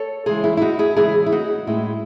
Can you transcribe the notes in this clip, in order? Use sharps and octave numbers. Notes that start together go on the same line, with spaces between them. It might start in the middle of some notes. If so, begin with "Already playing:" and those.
Already playing: A4 C#5
C#3 E3 G#3 G#4 C5
E4
E4
D#4 F#4
E4 G#4
C#3 E3 G#3 E4 G#4
E4
D#4 F#4
A2 G#3 C#4 E4